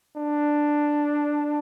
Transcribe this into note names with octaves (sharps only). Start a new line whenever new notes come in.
D4